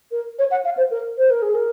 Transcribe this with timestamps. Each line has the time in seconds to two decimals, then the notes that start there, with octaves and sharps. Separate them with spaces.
0.11 A#4
0.39 C#5
0.51 F#5
0.65 F5
0.77 C5
0.91 A#4
1.18 C5
1.30 A#4
1.42 G#4
1.55 A#4